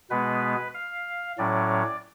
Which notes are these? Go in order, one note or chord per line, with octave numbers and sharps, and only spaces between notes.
B2 G#3 B3 B4
F5
A2 F#3 C#4 D5